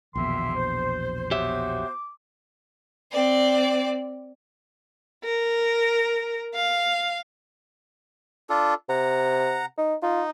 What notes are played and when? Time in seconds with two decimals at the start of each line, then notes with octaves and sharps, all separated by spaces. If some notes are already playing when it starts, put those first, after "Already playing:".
0.15 A#1 E2 B2 D#3 A#3 E5 C6
0.56 C5
1.31 B3 F#4 G4 C5 C#5 E5 D6
3.12 C4 D5
5.24 A#4
6.55 F5
8.50 D4 F4 A4
8.89 C3 F#5 A#5
9.78 D#4
10.03 D#4 F4